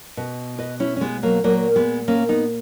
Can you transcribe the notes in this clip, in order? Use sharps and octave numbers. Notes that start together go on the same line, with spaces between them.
B2
B4 D#5
C#4 E4
C#4
G#3 B3
F#3 A#3
A#2 F#3 A#3
G#3 B3
A#3 C#4
B3 D#4